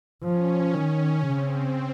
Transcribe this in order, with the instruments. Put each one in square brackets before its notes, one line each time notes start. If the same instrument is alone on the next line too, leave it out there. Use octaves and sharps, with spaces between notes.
[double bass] F3 [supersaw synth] C#4
[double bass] D#3 [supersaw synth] C#4
[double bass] C#3 [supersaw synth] C4